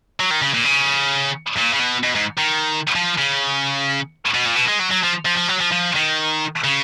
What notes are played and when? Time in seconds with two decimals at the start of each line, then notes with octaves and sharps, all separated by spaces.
0.20 F#3
0.31 D#3
0.42 C#3
0.54 A#2
0.65 C#3
1.57 A#2
1.74 C#3
1.80 B2
2.03 B2
2.15 G#2
2.38 D#3
2.96 F3
3.18 C#3
4.34 B2
4.46 A#2
4.56 B2
4.69 G#3
4.80 F#3
4.91 F#3
5.03 F3
5.26 F3
5.37 F3
5.48 F#3
5.60 F3
5.71 F3
5.95 D#3
6.64 C#3